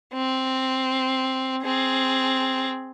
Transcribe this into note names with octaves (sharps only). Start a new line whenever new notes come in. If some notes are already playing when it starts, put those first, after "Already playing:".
C4
C4 G#4